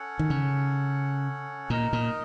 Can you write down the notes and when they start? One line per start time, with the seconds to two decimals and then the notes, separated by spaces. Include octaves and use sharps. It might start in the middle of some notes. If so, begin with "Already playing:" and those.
Already playing: C#4 A4 C#5 F#5
0.19 D#3
0.30 C#3
1.69 A#2 D#4 A#4 D#5
1.93 A#2